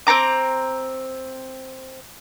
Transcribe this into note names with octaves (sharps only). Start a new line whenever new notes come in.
C4 C#4 A#5 D6